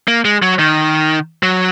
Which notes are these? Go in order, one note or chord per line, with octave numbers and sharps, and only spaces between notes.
A#3
G#3
F#3
D#3
F#3